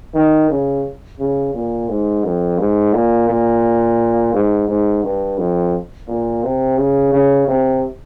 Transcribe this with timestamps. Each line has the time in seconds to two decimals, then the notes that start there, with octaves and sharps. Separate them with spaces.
0.14 D#3
0.50 C#3
1.19 C#3
1.54 A#2
1.89 G#2
2.24 F2
2.59 G#2
2.94 A#2
3.29 A#2
4.33 G#2
4.68 G#2
5.03 G2
5.38 F2
6.08 A#2
6.43 C3
6.78 C#3
7.13 C#3
7.48 C3